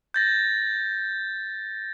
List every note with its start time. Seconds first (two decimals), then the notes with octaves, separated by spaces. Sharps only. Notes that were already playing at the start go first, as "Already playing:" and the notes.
0.14 G6 A6 A#6